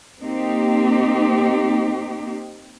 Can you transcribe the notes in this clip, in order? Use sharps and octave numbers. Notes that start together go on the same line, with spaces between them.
A#3 C4 D#4 G4